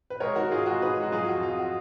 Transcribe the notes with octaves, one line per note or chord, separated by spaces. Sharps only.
B4
G#3 A#4 C#5
D#3 F#4 A#4
G#2 F4 G#4
G#3 F#4
G#2 G#4 B4
G#2 F#4
F#3 F4 G#4
F2 F#4
F2 F4
F#4